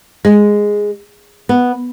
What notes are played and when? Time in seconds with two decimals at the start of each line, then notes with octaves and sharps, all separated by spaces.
0.25 G#3
1.49 B3